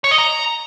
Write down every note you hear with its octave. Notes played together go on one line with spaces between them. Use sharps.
C#5
D#5
A#5